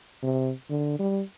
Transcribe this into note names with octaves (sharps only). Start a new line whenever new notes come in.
C3
D3
G3